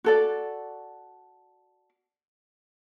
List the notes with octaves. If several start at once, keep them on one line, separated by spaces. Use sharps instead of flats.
F#4 A4 D5